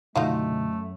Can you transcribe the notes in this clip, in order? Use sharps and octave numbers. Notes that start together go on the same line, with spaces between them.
F#2 B2 D3 A3 D#4 F4 F#4